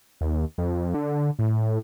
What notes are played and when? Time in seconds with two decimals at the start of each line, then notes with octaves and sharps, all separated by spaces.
0.21 D#2
0.58 F2
0.94 D3
1.39 A2